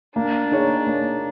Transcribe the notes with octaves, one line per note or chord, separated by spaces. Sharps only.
A#3 D4
D#4 G#4 C#5
A#3